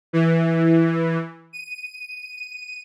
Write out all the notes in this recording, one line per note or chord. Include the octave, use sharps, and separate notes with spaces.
E3
D#7